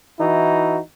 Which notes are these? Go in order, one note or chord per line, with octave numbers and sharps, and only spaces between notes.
E3 D#4 E4 F#4